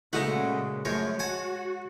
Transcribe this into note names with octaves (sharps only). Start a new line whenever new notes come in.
A#2 C#3 G#3 A3 D#4 F#4 F#5
F#2 F3 G#3 A3 C#5
F#4 F#5 G#5 A5